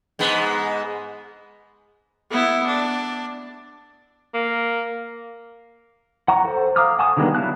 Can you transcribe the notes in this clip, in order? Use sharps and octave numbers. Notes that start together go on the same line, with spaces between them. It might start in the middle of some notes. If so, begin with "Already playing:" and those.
G#2 G#3 B3
B3 E4
D4
A#3
F#5 A#5 C#6
A4 C5
F5 A#5 D6 D#6 F6
F#5 G#5 A5 C#6 D#6
D3 D#3 G3 G#3 B3
F#3 E4 F5 A5 F#6